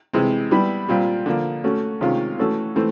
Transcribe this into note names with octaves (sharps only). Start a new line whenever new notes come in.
C3 E3 G#3 C4
G3 B3 E4
A#2 G3 C4 F4
D3 F3 A#3
A3 C#4 F#4
C3 D#3 G#3 C#4 F4
E3 A3 C#4 F#4 A4
E3 A3 C4